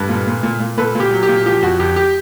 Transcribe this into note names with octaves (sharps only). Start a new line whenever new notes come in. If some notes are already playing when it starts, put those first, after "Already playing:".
Already playing: G2 A4 B4
A#2
A#2
A#2
A#2
A#2 A4 B4
A#2 G4
F#3
G4
A#2
F3 G4
F2 F#4
F2 G4
G4